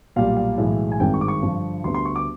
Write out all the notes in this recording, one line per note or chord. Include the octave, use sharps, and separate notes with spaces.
B1 A#2 G3 F5
F5
B1 A2 E3 G#3
G#5
G#1 G2 D#3 G#3 C4 G5
C#6
D6
C#6
G2 D3 F3
D2 D3 G3 B3 C6
C6
C#6
D6